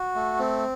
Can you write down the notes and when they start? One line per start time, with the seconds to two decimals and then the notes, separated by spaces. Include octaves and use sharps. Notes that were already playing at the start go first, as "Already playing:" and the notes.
Already playing: F#4
0.16 A3
0.39 C4